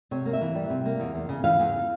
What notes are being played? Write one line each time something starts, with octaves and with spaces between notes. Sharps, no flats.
C3 C#5
A#3
E5
E3
G3
C3
A#3
E2
E2
C#3
E3 F5
E2